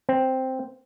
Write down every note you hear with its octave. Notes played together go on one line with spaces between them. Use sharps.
C4